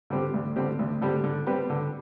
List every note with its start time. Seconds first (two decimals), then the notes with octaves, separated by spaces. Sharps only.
0.10 D3 G3 C4 G4
0.34 D2
0.56 D3 G3 C4 G4
0.79 D2
1.02 D3 G3 C4 G4
1.24 D3
1.47 G3 C4 G4 B4
1.70 D3